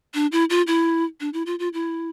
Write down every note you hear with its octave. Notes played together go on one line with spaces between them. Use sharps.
D4
E4
F4
E4
D4
E4
F4
F4
E4